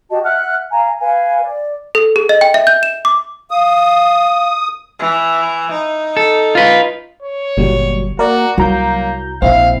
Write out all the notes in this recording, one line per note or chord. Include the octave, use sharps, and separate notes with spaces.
F#4 G4 D#5 A5
E5 F#5 F6 F#6
F5 G#5 A#5
B4 F5 G#5
D5
A4
G#4
D#5
G5
E5
G6
E7
D6
F5 D#6
E3
D#4
A4
F4 B4
C#5
G1 A#2 F#3 G3
A#3 F#4 A#4 D5
C2 F#3 A#3 E4 A#5 G6
A#1 A#2 C4 E4 F5